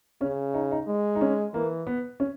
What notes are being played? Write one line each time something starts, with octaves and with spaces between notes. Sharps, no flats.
C#3 C#4
D#4
D#4
G#3
D#4
C#4
E3 A#3
B3
C#4